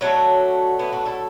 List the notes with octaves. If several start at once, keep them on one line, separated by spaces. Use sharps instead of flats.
D3 F#3 A3 D4 F#4
B3 E4
D4 F#4
E4 A4